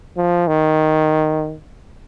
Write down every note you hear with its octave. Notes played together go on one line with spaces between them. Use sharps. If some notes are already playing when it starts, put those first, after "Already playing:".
F3
D#3